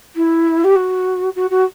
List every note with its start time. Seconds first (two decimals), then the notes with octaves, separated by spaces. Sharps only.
0.15 E4
0.64 G4
0.75 F#4
1.35 F#4
1.50 F#4